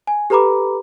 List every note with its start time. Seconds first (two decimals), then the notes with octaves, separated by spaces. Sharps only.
0.07 G#5
0.30 G4 A4 B4 A#5 B5 D6